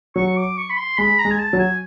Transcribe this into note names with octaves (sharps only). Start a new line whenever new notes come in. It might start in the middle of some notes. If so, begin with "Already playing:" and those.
F#3 C#6
D6
C#6
B5
C6
G#3 B5
A#5
G#3
G#5
A5
F#3
G#5